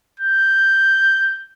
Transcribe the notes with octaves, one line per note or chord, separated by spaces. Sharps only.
G6